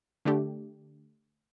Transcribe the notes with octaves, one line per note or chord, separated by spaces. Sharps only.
D3 A3 D4 G4